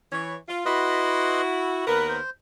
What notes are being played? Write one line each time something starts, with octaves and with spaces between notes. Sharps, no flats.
E3 C#5
F4
E4 F#4 B4 D#5 C6
D#2 B3 A#4 B4
C5